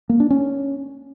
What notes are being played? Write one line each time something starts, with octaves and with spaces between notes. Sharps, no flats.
A#3
D4
C#4